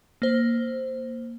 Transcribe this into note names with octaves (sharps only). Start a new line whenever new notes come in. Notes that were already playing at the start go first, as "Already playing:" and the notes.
A#3 C5